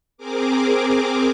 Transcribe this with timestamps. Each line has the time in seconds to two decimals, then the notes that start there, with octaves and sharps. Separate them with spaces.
0.17 C4 G#4 A#4 D6